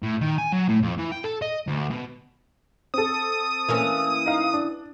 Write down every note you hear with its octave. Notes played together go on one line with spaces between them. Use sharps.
A2
D#3
G#5
F#3
A2
F2
E3
G5
A4
D#5
D2
B2
C4 A4 D#6
E3 A#3 C#4
D#4 F5
D4